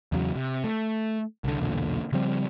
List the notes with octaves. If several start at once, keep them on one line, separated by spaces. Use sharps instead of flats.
E2 C#3 F#3
C3
A3
C2 D3
B1 E2 A#2 D3
C#3 F3 G3 C4